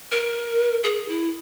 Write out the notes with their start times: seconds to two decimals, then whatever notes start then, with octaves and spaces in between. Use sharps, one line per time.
0.12 A#4
0.84 G#4
1.08 E4